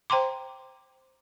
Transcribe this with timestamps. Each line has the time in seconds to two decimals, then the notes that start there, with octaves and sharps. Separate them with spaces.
0.10 C5 G5 A#5 C6 D6